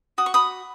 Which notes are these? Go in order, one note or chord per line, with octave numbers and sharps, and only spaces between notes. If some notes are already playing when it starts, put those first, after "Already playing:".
F#4 D#6
C#6
B5 D#6